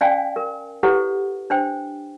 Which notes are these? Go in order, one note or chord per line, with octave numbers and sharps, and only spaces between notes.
C#4 D5 F5 G5 G#5
A#4
E4 G4 A4 B4 C#5 F#5
D4 C5 G5